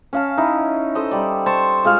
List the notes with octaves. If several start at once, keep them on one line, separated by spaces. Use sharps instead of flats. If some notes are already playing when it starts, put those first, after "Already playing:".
C#4 F5 A5
D#4 E4
A4 C5 D#5
G3 D5
C5 A5 C#6
G#3 F4 G#4 F5